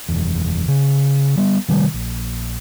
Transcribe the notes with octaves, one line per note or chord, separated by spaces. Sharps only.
F#1 E2
C#3
G3 B3
C3 D#3 G3
A#1